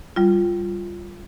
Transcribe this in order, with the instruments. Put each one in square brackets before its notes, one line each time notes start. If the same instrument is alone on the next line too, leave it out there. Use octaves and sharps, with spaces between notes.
[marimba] G3 F4